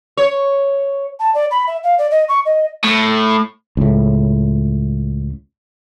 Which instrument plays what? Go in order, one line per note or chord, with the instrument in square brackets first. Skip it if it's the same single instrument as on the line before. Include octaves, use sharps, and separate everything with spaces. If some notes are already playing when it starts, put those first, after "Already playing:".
[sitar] C#5
[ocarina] A5
D5
B5
E5
F5
D5
D#5
C#6
D#5
[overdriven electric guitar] A2
[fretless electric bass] C#2 A2